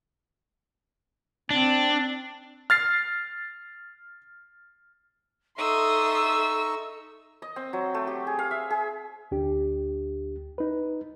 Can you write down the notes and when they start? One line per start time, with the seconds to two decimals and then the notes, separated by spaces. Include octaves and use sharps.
1.51 C4 D4
2.70 F6 A6 C7
5.59 D#4 A4 E5 C6 C#6 D#6 E6
7.42 D#5
7.56 C4
7.73 F#3
7.94 A3
8.07 G4
8.27 G#4
8.39 F5
8.51 E5
8.70 G#4
9.31 D2 D4 G4
10.58 D#4 B4